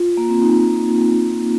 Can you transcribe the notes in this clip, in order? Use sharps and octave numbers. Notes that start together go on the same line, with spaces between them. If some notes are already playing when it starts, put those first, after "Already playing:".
Already playing: F4
A#3
C4
D#4